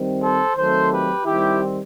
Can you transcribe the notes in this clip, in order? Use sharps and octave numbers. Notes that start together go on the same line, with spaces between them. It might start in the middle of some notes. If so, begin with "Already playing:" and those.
Already playing: D#3 G3 C4
A4 C5
D#3 F#3 A3 C4 A4 C5
G4 B4
D#3 G3 C4 E4 G4